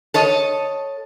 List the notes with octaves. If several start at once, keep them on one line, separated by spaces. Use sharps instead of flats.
A4 C#5 D#5